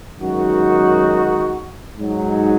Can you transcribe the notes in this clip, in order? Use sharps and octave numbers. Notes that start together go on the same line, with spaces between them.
F#2 D#3 G#3 D#4 F#4
G#2 F#3 D#4